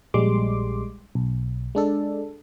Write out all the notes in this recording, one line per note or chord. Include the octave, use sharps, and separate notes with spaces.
A#1 G3 G#3 C6 D6
B1
G#3 D4 A4